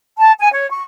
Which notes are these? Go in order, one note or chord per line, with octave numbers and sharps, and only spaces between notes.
A5
G#5
C#5
C#6